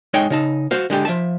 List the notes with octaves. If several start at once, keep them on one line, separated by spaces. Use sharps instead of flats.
G#3 D#4 C#5 G5
C#3 D#4 A5
F#4 C5 F5
D3 G#3 G4
F3 E5 A5